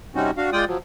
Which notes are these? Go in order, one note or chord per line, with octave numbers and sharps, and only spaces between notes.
C3 G3 C4 C#4 D#4 F#4
D4 F#4 F5
G#3 F4 D5 G5 D#6
F3 F#3